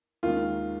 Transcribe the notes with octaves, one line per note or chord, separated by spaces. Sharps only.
D#2 D#3 G#3 F4